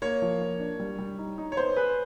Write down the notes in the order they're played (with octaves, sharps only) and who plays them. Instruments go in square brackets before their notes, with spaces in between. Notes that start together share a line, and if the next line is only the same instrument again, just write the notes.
[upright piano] A#3 [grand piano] C#5
[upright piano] F3
A#3
D4
G3
G3
D#4
D#4
[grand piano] C#5
[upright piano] B3 [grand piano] C5
[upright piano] G#4 [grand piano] B4